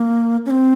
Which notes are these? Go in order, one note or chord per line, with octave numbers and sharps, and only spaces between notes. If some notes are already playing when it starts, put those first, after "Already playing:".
Already playing: A#3
C#4
C4